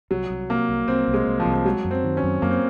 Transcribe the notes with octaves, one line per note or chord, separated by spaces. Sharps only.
C2 F#3
C2
C3 A#3
C2
C2 C4
C2
G#3
C2
F3
C2
F3
F#3 G#3
F#2
C4
D#3
C#4
F#2
F#2 A#3
C4